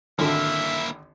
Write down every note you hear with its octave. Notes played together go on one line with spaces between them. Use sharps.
G#1 D3 A#3 E4 E5